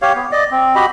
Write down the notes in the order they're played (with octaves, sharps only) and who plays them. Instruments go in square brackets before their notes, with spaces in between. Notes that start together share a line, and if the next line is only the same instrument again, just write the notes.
[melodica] G4 C#5 F5
B3
D5 D#5
C4
F#4 G4 D#5 B5